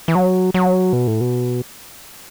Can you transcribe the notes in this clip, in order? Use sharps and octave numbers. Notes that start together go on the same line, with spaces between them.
E3
F#3
F#3
B2
A2
B2